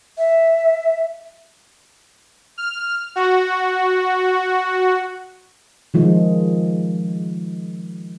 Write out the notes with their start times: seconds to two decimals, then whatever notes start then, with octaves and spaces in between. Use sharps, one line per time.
0.17 E5
2.58 F6
3.16 F#4
5.94 D#3 F3 G#3